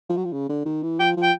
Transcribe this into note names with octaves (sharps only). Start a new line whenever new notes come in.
F3
F#3
F3
C#3
D3
D#3
E3
F3 G5
F3
G5